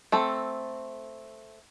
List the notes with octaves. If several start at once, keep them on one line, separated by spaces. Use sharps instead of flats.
A3 C4 A4